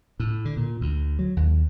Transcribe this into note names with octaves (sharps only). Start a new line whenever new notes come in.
A2
D3
A#2
D2
F#3
D#2